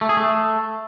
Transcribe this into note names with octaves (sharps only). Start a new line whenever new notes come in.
A3
G#4
A3